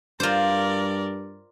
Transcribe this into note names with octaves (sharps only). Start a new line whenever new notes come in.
G2 F4 A#4 C5 D5